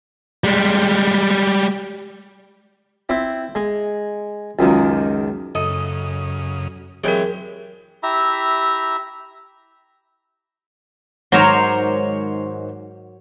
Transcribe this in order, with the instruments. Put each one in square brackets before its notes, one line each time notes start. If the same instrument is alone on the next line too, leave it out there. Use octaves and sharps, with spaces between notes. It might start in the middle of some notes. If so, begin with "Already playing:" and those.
[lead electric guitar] G3 G#3
[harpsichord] C4 E4
G#3
C#2 F#2 D#3
[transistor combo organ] F#2 C#3 D#6 [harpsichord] A4 [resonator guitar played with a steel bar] D#5
[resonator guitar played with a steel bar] E3 G#3 G4 [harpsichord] F#3 C4 [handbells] G#4 A#4
[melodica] E4 G4 E5 A#5
[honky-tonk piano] G#2 D#3 D6 [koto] F#3 A#4 [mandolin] C5 C#5